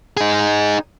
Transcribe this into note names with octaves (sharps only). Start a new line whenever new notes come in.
D#4 G#4